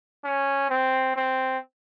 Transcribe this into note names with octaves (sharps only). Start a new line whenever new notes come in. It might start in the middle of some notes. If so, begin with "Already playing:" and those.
C#4
C4
C4